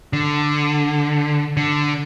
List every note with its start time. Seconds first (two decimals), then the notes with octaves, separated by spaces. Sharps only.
0.13 D3
1.57 D3